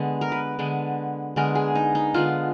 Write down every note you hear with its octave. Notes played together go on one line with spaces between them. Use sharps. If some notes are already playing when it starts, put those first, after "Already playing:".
Already playing: D3 G#3 B3
A#4
B4
D3 G#3 B3
D3 G#3 B3 A#4
G#4
D#4
D#4
D3 G#3 B3 F4